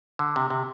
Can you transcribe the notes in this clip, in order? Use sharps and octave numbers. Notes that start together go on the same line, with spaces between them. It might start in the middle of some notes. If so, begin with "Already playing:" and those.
D3
C3
C3